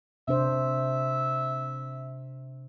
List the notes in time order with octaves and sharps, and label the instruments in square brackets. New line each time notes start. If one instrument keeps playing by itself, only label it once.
[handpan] C3 D4 C5 [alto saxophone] E5